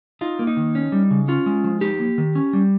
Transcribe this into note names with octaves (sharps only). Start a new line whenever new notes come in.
D#4 F4
A#3
D#4
D#3
C#4
G3
C#3
C#4 F4
G#3
F3
D#4 G4
A#3
D#3
C#4
G3